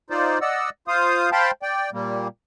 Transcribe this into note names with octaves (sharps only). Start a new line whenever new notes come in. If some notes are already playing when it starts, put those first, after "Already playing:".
D#4 F4 C5 D5
D5 D#5 F#5 E6
F4 C5 F5 D#6
C5 F5 G5 A5 B5 C6
D5 G5
A#2 G3 A#3